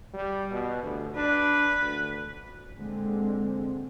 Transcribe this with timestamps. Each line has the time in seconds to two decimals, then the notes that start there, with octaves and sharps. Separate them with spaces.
0.13 G3
0.51 B2
0.83 D2
1.16 D4 B4
1.81 D2
2.74 A#2 D3 G#3 C4